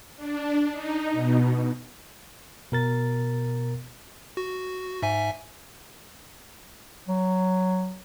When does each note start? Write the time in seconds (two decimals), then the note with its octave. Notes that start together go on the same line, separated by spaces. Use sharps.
0.16 D4
0.72 D#4
1.12 B2
2.72 B2 A#4 A6
4.37 F#4
5.02 G#2 E5 G#5
7.08 F#3